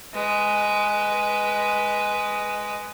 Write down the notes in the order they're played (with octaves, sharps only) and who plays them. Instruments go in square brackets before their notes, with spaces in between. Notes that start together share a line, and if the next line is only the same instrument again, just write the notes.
[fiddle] G#3 B4